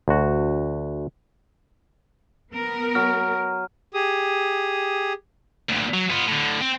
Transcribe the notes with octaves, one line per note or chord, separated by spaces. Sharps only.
D2 F#4
B3 A#4
F#3 F6
G4 G#4 D#6
D2 A#2
F#3
B3 F4
A2 D3
C4